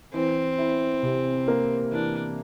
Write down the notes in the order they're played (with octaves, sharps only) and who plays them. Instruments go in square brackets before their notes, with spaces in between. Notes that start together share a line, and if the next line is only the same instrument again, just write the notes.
[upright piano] E3 [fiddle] C4
[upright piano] E4
C3
A#3
[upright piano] E3 [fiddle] D4